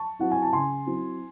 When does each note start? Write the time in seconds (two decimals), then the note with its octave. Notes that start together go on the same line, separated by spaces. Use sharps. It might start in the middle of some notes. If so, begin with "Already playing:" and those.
Already playing: A5 C#6
0.19 F#3 C4 E4 F#5
0.31 G#5
0.42 A5
0.53 C#3 G#5 C6
0.86 F#3 C4 E4